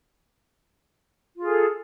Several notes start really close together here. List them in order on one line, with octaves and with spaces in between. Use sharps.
F4 G#4 A4